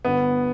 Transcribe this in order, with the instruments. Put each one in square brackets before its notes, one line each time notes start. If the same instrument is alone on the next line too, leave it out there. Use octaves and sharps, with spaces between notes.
[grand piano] G1 [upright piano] B3